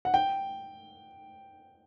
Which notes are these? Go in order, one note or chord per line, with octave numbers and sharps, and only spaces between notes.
F#5
G5